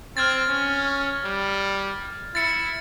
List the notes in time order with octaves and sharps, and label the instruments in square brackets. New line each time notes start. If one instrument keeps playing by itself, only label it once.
[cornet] C4 [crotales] F6 G#6 A6
[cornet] C#4
G3
[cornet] E4 [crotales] A6 C#7